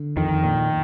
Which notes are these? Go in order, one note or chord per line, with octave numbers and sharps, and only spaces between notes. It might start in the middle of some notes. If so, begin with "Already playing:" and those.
Already playing: D3
F2 D#3
A#2